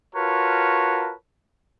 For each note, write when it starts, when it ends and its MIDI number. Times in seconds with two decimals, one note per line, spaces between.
0.15 1.14 65
0.15 1.14 66
0.15 1.14 70
0.15 1.14 71
0.15 1.14 73
0.15 1.14 81